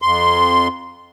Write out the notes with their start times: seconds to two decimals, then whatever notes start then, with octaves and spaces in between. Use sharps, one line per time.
0.02 F2 C6